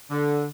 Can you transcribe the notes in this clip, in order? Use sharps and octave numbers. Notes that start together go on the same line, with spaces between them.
D3